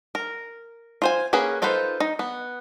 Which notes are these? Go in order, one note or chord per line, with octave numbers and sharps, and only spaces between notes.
A#4
F4 C5 G#5
A#3 C#4 G#4 B4
D#4 F4 A4 B4 C5
D#4
B3